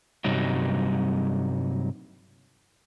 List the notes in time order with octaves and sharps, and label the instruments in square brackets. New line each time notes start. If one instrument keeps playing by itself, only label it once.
[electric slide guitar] G2 C3 F#3 G3 D#4